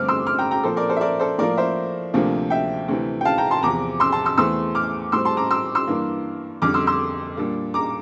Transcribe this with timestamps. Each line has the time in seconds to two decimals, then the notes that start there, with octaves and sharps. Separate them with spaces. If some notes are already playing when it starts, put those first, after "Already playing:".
Already playing: G2 D3 A3 C4 D6 F6
0.09 C6 E6
0.27 D6 F6
0.39 G5 A#5
0.51 G5 A#5
0.63 A#2 F3 C4 A4 C5
0.76 A#4 D5
0.90 A4 C5
0.97 E5
1.01 A#4 D5
1.20 A4 C5
1.38 A2 F3 A#3 A#4 D5
1.57 C5 E5
2.14 D2 C3 F3 A#3 D4
2.50 E5 G5
2.88 D2 C3 E3
3.21 G5
3.25 F5 A5
3.38 G5 A#5
3.51 A5 C6
3.63 E2 C3 F3 A#5 D6
4.00 C6 E6
4.12 A5 C6
4.25 C6 E6
4.37 E2 E3 A3 C4 C6 E6
4.75 D6 F6
5.12 A2 G3 C4 C6 E6
5.25 A5 C6
5.37 A#5 D6
5.50 C6 E6
5.75 C6 E6
5.87 G2 E3 A#3 D4
6.62 F2 D3 G3 D4 D6 F6
6.74 C6 E6
6.87 C6 E6
7.37 A#2 G3 D4
7.74 A#5 D6